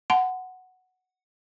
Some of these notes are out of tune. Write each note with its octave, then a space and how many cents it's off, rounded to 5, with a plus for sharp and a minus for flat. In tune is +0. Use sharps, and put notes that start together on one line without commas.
F#5 +0 A5 -20 C6 -45